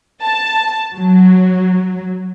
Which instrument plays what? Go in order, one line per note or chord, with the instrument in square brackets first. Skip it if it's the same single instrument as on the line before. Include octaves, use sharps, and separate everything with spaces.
[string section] A5
F#3